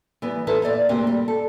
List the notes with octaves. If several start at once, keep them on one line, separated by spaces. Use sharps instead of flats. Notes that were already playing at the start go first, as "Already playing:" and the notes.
E3 G3 B3
D#4 E4 A4 B4 C5
A#2 D5 E5 F5
D2 C3 A#3 C4
G3
A4